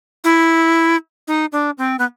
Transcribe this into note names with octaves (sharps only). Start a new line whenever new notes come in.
E4
D#4
D4
C4
B3